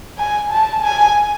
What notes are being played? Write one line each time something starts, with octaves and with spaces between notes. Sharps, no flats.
G#5
A5
G#5